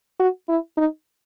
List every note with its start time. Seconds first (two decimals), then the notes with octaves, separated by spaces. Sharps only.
0.20 F#4
0.49 E4
0.77 D#4